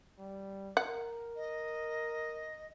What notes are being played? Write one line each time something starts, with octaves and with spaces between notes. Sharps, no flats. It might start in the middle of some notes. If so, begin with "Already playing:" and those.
G3
A#4 F#5
D#5